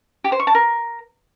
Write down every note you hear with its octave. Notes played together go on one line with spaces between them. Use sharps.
G4
C5
C#6
A5
A#4